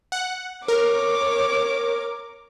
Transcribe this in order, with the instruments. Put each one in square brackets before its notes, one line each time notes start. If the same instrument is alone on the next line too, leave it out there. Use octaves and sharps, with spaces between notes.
[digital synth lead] F#5
[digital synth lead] A#4 [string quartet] C#5 D6